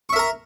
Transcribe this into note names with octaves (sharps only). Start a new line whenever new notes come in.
A#4 E5 A#5 C#6